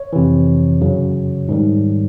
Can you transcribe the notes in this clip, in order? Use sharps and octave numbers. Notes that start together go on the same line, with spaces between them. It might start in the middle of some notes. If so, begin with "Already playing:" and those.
Already playing: C#5
F2 C3 E3
F#2 C#3 F#3
G#2 D#3 G3